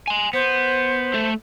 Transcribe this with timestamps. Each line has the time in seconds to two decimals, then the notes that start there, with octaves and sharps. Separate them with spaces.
0.08 G#5 C6
0.33 B3 C5
1.14 A3 A4